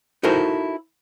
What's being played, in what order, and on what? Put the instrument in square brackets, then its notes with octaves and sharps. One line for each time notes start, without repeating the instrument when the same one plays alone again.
[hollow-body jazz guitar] D#4 E4 F#4 A4 A#4 C5